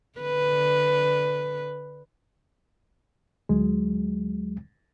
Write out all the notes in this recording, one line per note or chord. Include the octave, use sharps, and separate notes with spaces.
D3 B4
D2 F#3 G#3